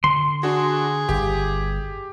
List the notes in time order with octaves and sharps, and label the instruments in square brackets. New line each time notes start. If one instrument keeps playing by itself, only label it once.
[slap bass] D3 [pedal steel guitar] C6
[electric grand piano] D4 F#4 [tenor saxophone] G#4
[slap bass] G1 [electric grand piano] G4